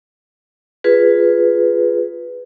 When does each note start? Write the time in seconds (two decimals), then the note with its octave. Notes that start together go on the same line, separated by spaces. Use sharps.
0.84 F4 G#4 B4